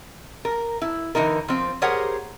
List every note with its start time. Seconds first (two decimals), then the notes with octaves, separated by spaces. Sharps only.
0.45 A#4
0.82 E4
1.15 D3 E3 C4 D#4 A#4
1.48 F3 C4
1.82 G4 G#4 A#4 C5 C#5 F#5